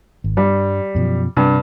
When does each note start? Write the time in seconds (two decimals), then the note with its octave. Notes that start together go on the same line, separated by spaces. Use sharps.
0.24 G#1
0.37 G2 G3
0.95 F#2 B2 F3
1.37 G2 C3